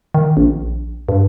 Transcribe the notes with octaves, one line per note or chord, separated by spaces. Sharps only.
D#3
A#1
G2